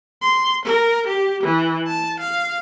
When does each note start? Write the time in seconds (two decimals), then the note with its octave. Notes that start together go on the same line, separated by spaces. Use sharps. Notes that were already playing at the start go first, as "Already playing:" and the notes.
0.22 C6
0.65 A#4
1.07 G4
1.43 E3
1.87 A5
2.20 F5